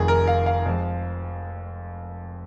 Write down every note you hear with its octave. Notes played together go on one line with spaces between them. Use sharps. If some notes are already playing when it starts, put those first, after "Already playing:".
Already playing: F1 F2 D#3 G#4
A#4
F5
F5
F2 F3 G#3